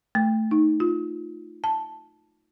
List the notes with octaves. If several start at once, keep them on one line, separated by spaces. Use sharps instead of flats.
A3
D#4
F4
A5